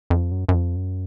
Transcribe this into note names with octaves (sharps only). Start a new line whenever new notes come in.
F2
F#2
F#2
F2
F#2